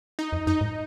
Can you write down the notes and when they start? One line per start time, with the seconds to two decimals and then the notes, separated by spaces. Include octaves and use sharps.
0.19 D#4
0.32 F2
0.47 F#2 D#4
0.61 G#2